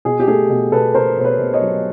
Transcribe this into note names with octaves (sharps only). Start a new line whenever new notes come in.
B2 G#4
G4
A3 G#4
B2
B2 A4 B4
B2 A#4 C5
B2 C5
B4 C#5
B2
C#5 D#5
F#3